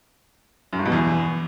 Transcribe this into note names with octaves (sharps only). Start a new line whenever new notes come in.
F#2
G2
B2
E2